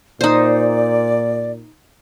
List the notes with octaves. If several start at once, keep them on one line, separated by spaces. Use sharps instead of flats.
A#2 D#4 C5 D5